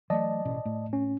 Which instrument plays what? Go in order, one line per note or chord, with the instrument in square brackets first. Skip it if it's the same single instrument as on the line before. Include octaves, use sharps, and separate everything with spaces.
[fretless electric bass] E3 F#3 A3 [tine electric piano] D5 D#5 A5
[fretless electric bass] A1 B2 C#4
A2 A3
[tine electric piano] C#4